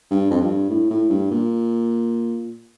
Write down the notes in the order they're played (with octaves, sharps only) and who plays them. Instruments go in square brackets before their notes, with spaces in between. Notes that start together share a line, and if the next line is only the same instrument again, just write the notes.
[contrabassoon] G2
F2
G2
A2
A2
G2
A#2